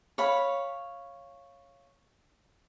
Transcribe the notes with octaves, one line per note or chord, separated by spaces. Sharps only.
C#5 F5 B5